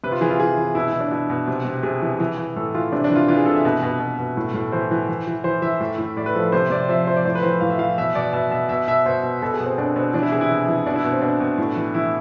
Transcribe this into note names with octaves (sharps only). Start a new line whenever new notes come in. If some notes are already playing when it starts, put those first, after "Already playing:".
C3 B4
F4
E3 G#4
F4
E3 G#4
E3
B2 E4
E4
B2
D4
B2 E4
B2
C3
C3
C3 G#4
E3
E3
E3
A2 A4
E3 F4
C3 D4
D4
E3
F4
E3 F4
G#4
C3 A4
E5
B2
B2
B2
B2
A2
A2
E3 C5
E3
E3
E3
E3 C5
E3 E5
A2
A2
A2 D5
B4
F3 A4
C3 C5
C3 D5
F3 E5
F3 C5
D5
A2 C5
B4
E3 C5
A2 F5
E5
E3 F5
B2 E5
B2 D5
B2 E5
B2 E5
B2 E5
B2 E5
B2 C5
B2
B2 A4
G#4
B2
C4
B2 D4
B2 C4
E3 D4
E4
C3 G#4
E4
E3
E3
B2 D4
E4
B2
C4
B2 D4
B2
A2
E3
E3 E4